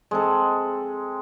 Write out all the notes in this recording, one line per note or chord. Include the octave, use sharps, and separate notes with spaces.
G#3 C4 A4